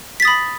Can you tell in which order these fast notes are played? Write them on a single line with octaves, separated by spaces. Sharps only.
B6 A6 D#6 B5